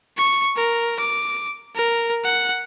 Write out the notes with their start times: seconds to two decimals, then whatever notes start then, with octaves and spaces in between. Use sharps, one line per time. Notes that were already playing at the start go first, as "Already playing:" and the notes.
0.18 C#6
0.56 A#4
0.99 D6
1.76 A#4
2.24 F#5